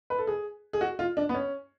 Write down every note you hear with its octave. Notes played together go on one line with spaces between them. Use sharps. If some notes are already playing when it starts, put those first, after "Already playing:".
B4
A4
G#4
G#4
F#4
F4
D4
B3
C#4